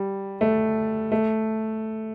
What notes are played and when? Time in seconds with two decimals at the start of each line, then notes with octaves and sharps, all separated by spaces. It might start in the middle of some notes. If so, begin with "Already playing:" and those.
Already playing: G3
0.41 A3
1.12 A3